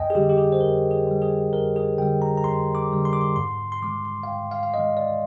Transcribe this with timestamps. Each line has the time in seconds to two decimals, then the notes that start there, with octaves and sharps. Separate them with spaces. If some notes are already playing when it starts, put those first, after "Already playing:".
Already playing: F2 D#5 G5 G#5
0.10 G#4
0.15 D3 G3 G4
0.29 G4
0.38 G#4
0.52 C5
0.60 F2 A#4
0.91 G#4
1.06 D3 G3
1.22 G#4
1.53 F2 A#4
1.76 G#4
1.98 D3 G3 G5
2.22 A#5
2.38 A#5
2.44 F2 C6
2.75 D6
2.91 D3 G3
3.05 C6
3.13 D6
3.21 C6
3.36 G#2 C6
3.72 C6
3.82 D#3 G#3 D6
4.05 C6
4.23 F5
4.28 G#2 G5
4.51 F5
4.63 F5
4.74 D#3 G#3 D#5
4.97 D5